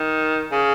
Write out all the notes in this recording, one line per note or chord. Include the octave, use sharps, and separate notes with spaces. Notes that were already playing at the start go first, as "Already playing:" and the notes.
Already playing: D#3
C#3